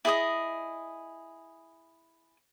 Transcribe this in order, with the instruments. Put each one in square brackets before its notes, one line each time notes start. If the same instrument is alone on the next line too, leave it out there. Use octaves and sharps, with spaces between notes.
[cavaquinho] E4 G#4 D#5 D#6